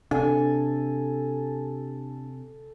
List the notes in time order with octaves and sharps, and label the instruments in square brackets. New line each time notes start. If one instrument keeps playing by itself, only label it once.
[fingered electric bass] C3 [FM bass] D4 [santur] A4 G#5